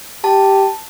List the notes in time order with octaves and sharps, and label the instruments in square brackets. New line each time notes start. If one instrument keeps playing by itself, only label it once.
[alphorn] G4 [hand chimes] A5